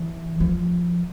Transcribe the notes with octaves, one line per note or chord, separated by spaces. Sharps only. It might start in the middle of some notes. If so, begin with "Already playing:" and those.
Already playing: E3
F3